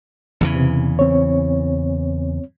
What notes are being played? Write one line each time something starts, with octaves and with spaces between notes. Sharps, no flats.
E2 C#3 E3
C3
C4 C#5